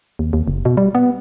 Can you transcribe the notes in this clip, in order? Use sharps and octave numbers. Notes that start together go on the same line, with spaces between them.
D#2
D#2
F#1
B2
G3
B3